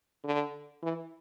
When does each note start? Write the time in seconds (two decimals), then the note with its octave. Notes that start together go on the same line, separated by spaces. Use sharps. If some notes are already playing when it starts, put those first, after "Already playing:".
0.24 D3
0.83 E3